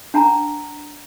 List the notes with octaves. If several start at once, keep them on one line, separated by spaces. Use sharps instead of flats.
D4 F#5 A5 A#5